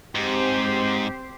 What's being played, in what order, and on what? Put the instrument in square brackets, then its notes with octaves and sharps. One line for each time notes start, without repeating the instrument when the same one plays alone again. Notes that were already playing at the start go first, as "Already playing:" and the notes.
[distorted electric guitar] G#2 [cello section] C4 G4 C5